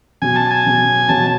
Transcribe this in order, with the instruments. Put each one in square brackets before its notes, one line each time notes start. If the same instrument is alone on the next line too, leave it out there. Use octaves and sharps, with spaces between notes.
[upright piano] B2 F#3 B3 F#4 [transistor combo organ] G#5
[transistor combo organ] A5
G#5
[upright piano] B2 F#3 B3 F#4
[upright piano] B2 F#3 B3 F#4 [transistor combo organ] A5